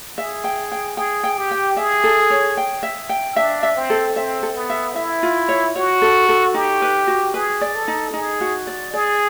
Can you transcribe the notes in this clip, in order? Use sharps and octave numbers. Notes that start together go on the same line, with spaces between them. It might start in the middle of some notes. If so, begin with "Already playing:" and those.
G#4 E5
G5
G5
G#4 G5
G5
G4
G5
G#4 E5
A4
C#5
G5
E5
G5
D4 E5
E5
C4
A4
C4 E5
A4
B3
E5
E4 E5
F4
C#5
F#4 C#5
A4
A4
D#4 G4
B4
F#4
G#4 B4
D5
A4
D#4
D#4 G#4
F#4
D5
G#4 D5